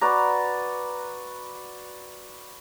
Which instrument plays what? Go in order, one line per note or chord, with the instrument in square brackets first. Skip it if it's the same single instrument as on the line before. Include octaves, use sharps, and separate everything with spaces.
[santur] F#4 B4 D5 A#5